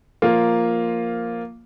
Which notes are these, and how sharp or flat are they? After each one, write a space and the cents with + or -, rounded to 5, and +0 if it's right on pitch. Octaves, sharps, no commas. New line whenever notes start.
F3 +0 A#3 +0 F4 +0